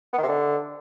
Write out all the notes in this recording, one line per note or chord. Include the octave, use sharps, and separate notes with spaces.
B3
D#3
C3
D3